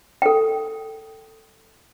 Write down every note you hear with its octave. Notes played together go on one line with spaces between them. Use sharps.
A4 G5